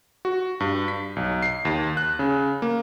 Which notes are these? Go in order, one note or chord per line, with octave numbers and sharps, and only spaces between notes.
F#4
G2
B6
B1
C7
D#2
F#6
C#3
A#3